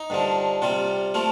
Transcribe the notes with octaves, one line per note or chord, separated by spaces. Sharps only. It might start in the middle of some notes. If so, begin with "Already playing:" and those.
Already playing: D#4
G2 D3 F3
C3 G3 F4
F3 A3 F4